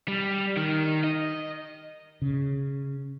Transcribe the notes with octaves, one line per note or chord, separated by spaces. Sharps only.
G3
D#3
D#5
C#3